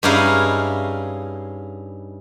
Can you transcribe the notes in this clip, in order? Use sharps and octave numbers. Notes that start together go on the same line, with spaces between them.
G2 C#4 D#4 E4 G#4 F5